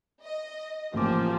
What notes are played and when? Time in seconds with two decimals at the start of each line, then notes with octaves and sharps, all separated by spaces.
0.22 D#5
0.94 A1 F3 A#3 G4 G#4 C5 D6